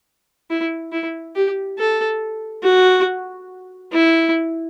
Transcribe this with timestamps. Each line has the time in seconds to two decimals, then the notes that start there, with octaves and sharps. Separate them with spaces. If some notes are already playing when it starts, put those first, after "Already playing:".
0.50 E4
0.92 E4
1.36 G4
1.78 A4
2.64 F#4
3.93 E4